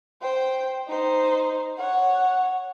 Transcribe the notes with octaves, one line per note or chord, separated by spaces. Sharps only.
C5 G5
D#4 C5
C#5 F#5